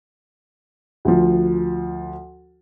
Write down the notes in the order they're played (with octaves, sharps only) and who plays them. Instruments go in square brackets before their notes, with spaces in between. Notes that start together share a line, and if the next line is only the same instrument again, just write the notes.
[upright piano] D2 F3